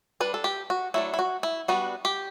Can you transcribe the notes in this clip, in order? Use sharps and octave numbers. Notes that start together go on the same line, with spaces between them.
G3 D4 B4
A4
G4
F#4
F#3 A3 D4 E4
E4
F#4
E4
G3 B3 D4 F#4
G4